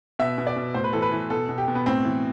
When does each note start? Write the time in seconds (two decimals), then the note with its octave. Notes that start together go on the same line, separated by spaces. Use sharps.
0.19 B2 E5
0.38 B2
0.47 D5
0.56 B2
0.74 A2 C5
0.84 B4
0.93 E3 A4
1.02 B4
1.12 E3
1.30 B2 A4
1.49 B2
1.58 G4
1.68 B2
1.75 B3
1.86 A2 C4
2.05 E3